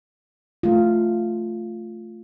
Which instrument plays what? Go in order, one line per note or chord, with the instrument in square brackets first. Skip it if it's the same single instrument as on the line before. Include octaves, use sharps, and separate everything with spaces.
[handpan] A3 F4